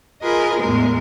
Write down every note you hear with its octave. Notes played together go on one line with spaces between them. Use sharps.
F4 G#4 A#4 B4 D#5
E2 A2 G#3 A#4